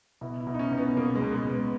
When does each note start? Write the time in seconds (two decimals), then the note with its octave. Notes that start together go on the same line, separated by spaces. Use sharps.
0.21 B2 E4
0.41 E4
0.47 B2
0.54 D#4
0.59 C#4
0.72 B2
0.78 B3
0.97 B2 A#3
1.15 G#3
1.22 B2
1.35 G#3
1.47 B2
1.53 B3